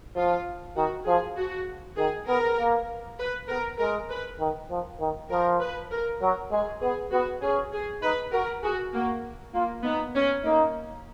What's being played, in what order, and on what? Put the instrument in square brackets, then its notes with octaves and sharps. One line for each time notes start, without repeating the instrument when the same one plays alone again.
[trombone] F3 [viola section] F4
[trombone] D#3 [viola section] F#4
[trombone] F3 [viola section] G#4
[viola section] F#4
[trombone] D#3 [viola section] G#4
[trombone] B3 [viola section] A#4
[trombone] A#3
[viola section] B4
[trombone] B3 [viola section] A#4
[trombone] G#3 [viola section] A#4
[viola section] B4
[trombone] D#3
F3
D#3
[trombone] F3 [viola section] A#4
[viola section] B4
A#4
[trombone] F#3 [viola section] A#4
[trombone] G#3 [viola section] G#4
[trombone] B3 [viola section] G#4
[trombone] B3 [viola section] F#4
[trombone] C#4 [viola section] G#4
[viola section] G#4
[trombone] D#4 [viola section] B4
[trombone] F#4 [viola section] A#4
[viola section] F#4 [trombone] G#4
[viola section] A#3 [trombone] F#4
[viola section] A#3 [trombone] F4
[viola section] B3 [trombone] D#4
[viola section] C#4
[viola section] A#3 [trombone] D#4